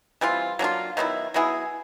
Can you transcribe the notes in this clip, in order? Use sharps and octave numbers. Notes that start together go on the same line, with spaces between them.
E3 G3 C4 F4
F#3 A#3 D4 F4
D#3 F#3 B3 E4
F#3 B3 E4 G#4